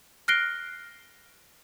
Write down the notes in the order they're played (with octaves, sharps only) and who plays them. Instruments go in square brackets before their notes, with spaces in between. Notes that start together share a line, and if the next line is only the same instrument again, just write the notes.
[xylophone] F6 F#6 A#6 C7 D7 G7